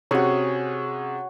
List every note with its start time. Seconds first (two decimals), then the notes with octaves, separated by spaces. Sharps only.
0.11 C3 C#4 F#4 G#4 C#5